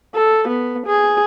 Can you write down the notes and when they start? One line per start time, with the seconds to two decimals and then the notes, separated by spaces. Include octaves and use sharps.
0.15 A4
0.48 B3
0.87 G#4